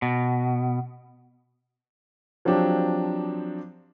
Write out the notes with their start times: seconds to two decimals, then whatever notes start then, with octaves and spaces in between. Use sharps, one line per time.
0.02 B2
2.45 F3 F#3 C4 D4 G4